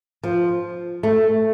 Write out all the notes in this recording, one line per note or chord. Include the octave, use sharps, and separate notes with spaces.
F3
A3